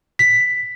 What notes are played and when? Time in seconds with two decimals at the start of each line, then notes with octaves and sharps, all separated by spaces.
0.19 B6